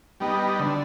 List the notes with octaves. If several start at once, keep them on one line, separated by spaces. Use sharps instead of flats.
G3 B3 D#4
D3